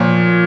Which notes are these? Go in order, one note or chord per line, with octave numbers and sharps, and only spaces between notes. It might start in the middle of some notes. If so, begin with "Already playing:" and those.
Already playing: A#2 F3 C#5